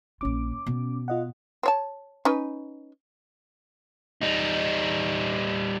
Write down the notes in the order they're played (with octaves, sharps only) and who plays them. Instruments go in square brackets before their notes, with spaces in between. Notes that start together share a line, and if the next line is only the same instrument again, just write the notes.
[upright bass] A#1 F4 [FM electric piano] C#4 D6
[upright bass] B2
[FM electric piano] F4 D#5 F#5
[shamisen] C4 C#5 A5
C#4 D#4 B4
[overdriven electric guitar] G3 D#4